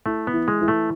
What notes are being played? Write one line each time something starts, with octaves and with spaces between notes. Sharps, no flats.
A3 E4
B3
E3
G#3
E3
A3